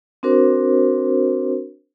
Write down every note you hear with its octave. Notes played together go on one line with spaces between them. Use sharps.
C4 D4 F#4 A#4 C5